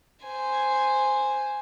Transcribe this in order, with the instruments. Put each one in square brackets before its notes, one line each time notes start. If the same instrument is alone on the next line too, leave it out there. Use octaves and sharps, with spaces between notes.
[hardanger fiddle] C5 G#5